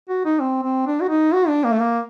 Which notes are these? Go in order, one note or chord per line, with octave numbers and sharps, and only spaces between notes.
F#4
D#4
C4
C4
D4
F#4
D#4
F#4
D4
A#3
A3
A#3